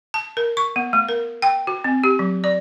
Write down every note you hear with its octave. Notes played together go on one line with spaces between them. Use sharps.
A5
A#4
C#6
B3
A3
A#4
G5
F#4
C4
G4
F#3
D5